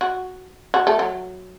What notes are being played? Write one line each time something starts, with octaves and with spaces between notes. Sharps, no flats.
F#4
F#4
A3
F#3